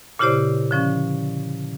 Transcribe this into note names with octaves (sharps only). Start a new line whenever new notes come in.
A#2 C#3 E4 G4 C5 D5
D3 F3 C#4